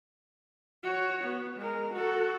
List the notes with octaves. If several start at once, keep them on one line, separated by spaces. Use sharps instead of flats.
F#4 C#5
B3
G#3 A#4
F#4 A4